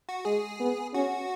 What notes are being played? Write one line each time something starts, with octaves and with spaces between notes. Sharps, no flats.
F#4
G#3 G#4
B3
C#4 F#4